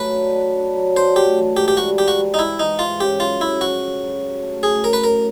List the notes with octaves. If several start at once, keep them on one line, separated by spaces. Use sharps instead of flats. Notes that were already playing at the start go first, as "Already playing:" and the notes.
Already playing: F#3 A3 B4
D4
D4
D4
F#3
D4 C5
A3 G4
E3
G#2 G4
G4
G3 F#4
G3 G4
F#4
G#2
D#4
G#2 E4
E3 D#4
G#2 F4
C#3 G4
F#2 F4
C#3 E4
F3 F#4
C#3
F#2
C#3
A3
A2 G#4
A2 A#4
B4
A2 A#4